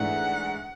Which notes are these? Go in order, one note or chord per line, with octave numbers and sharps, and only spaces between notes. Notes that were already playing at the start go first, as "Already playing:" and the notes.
Already playing: G#2 E3 A3 D4 F#5